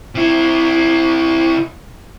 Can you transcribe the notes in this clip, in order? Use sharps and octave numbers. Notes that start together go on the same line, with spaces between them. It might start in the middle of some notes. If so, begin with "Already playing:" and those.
C3 E4